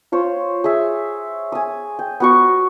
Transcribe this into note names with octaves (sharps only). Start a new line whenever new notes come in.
F4 C5 C#5
G#4 E5
G#5 D#6
G5
B3 F#4 C#6